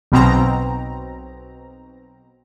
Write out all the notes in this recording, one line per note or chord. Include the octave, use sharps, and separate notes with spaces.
B1 B2 C4 A#5